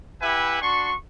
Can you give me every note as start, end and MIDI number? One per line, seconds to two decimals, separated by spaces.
0.21 0.57 64
0.21 0.57 67
0.21 0.57 71
0.21 0.57 76
0.21 0.57 78
0.21 0.57 80
0.61 0.93 62
0.61 0.93 66
0.61 0.93 84
0.61 0.93 85